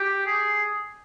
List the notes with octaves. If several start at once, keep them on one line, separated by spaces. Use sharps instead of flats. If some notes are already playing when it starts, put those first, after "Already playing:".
Already playing: G4
G#4